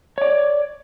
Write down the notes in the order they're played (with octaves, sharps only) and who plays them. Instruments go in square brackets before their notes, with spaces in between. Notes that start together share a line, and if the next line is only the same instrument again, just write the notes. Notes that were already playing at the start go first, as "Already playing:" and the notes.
[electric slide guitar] C#5 D5